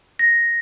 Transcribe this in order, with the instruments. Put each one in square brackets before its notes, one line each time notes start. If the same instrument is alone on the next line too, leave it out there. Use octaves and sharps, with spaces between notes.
[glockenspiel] A#6